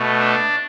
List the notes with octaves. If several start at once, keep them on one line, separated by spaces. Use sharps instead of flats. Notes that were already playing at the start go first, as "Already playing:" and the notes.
Already playing: B2 A3
D4